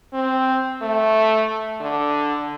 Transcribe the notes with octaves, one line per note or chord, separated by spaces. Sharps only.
C4
A3
D3